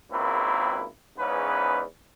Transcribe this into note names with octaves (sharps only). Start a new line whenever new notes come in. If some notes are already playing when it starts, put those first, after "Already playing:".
G#1 C#2 A#3 C4 E4 B4
E2 G#2 C#3 C#4 B4